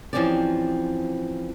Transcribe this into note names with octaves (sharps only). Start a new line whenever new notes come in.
E3 F3 C4 C#4 G4 D5